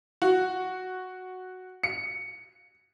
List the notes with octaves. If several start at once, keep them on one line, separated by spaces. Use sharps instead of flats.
F#4
C#7